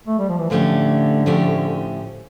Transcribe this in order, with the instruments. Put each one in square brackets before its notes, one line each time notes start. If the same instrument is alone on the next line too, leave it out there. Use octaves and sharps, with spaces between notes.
[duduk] A3
G3
F3
E3
[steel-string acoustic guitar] A2 F3 A3 C#4 G4 [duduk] D3
[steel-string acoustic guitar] A2 F3 A3 C#4 G4